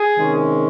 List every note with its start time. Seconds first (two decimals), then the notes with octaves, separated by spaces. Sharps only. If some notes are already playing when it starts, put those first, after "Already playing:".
Already playing: G#4
0.18 C3 D#3 G#3 C#4